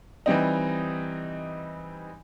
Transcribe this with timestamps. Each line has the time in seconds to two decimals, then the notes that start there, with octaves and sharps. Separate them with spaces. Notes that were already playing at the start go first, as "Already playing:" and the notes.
0.26 E3 G3 C4 D#4